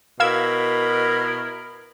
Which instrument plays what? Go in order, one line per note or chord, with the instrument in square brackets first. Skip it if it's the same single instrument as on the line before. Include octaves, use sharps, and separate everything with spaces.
[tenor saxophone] B2 [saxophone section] E4 A#4 [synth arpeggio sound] F5 E6 G#6